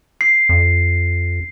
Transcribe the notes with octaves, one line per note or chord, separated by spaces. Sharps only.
C7
F2